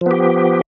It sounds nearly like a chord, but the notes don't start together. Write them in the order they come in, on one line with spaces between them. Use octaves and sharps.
F3 B3 G4